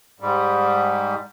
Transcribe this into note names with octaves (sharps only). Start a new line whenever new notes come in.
G#2 G3